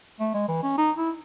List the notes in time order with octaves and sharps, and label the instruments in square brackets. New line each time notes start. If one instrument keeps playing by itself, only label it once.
[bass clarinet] A3
G#3
E3
C#4
D#4
E4